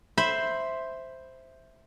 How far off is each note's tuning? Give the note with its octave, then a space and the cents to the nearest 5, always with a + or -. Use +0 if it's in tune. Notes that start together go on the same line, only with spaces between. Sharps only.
C5 +0 E5 +0 B5 +0